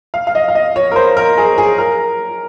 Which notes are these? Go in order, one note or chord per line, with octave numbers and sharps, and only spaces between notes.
F5
F5
D#5
F5
D#5
C#5
A#4
C5
A#4
G#4
G#4
A#4